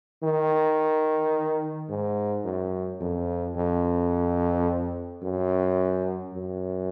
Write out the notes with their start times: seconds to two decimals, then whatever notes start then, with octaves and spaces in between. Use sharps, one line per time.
0.23 D#3
1.89 G#2
2.44 F#2
3.00 F2
3.56 F2
5.22 F#2
6.34 F#2